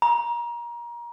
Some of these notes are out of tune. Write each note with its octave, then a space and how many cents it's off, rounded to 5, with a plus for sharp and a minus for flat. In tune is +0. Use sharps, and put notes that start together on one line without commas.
A#5 +25